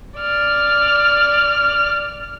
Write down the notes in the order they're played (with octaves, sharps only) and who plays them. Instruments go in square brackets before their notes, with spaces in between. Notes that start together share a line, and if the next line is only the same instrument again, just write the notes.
[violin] D5 F6